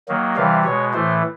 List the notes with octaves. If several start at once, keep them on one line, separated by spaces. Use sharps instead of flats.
D#3 F#3 A#3
C3 E3 G3 F5
B2 G#3 C#5
A2 E3 A3 C5